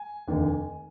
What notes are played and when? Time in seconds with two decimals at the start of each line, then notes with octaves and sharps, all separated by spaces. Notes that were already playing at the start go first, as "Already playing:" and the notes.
Already playing: G#5
0.28 F1 D#2 D3